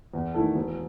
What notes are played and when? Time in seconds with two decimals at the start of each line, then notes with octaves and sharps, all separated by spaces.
0.14 E2
0.34 D#3 A3 E4 A4
0.55 E1